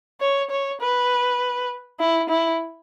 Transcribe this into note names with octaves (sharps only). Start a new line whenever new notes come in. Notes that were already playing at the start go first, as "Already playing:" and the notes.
C#5
C#5
B4
E4
E4